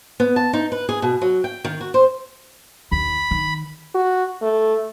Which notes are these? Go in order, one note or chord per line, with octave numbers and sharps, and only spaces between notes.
B3
A5
D#4
B4
G#4
B2
F#3
G5
D#3
F#4
C5
D#2 B5
D#3
F#4
A3